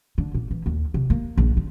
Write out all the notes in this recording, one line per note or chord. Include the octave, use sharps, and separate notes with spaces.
D3
A#2
E3
D#2
C3
A#3
A#1
D3